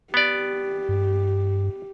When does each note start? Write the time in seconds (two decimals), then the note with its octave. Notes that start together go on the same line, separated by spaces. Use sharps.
0.14 B3 G4 D5
0.89 G2